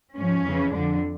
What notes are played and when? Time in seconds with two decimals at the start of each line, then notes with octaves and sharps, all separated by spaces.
0.15 G#2 F3 C#4
0.44 F2 C#3 E3
0.73 F2 D3 F3 D4